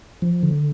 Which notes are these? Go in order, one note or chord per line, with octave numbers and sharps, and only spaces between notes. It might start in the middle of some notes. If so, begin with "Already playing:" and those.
F3
D3